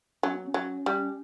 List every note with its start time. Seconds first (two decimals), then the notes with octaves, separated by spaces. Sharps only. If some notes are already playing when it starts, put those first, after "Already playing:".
0.23 F#3 C#4
0.35 B3
0.47 C#4
0.54 F#3
0.86 G3